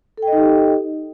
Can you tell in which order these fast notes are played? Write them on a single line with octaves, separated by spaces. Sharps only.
A4 G5 D#5 D#4 G4